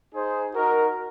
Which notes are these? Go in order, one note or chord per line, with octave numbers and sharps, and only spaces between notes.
D#4 G#4 C5
D#4 F#4 A#4